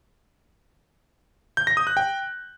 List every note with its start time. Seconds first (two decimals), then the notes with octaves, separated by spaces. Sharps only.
1.57 G6
1.67 A#6
1.77 D#6
1.87 F#6
1.97 G5